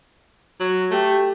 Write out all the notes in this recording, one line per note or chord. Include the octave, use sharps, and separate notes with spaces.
F#3
A3 G4